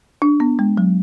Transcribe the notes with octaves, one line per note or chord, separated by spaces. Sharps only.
D4
B3
G#3
F#3